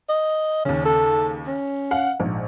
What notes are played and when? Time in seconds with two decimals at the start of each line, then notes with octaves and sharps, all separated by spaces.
0.09 D#5
0.65 D#2 C#3 C#4
0.85 A4
1.47 C#4
1.91 F5 F#5
2.20 A#1 G#2